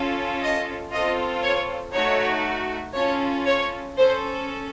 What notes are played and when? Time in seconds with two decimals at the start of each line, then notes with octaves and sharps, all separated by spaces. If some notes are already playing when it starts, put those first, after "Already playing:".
Already playing: C#4 F4 A4
0.41 D#5
0.91 C4 F4 A4 D#5
1.43 C#5
1.93 A3 D#4 F#4 C#5
2.95 C#4 F4 A4 C#5
3.46 C#5
3.96 C#4 A4 C5